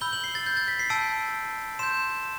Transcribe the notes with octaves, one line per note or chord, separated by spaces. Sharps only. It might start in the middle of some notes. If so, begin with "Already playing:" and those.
B5 E6 G6 G7
F#7
C7
A6
G6
A6
B6
C7
A5 E6 G6 D7
C6 G6 E7